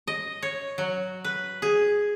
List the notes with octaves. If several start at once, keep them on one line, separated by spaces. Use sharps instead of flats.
D#5
C#5
F#3
B4
G#4